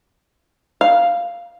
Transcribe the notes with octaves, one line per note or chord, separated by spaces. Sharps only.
F5